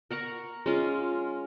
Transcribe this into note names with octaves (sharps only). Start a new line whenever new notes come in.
A#4 F#5 A#5 C#6
G#3 C#4 F4